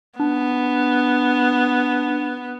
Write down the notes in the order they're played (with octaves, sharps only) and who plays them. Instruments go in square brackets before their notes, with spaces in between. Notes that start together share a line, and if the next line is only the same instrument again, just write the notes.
[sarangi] B3 [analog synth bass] D4